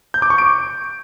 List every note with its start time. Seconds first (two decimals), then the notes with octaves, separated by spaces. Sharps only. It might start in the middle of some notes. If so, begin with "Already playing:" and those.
0.14 G6
0.22 D6
0.30 C#6
0.38 D7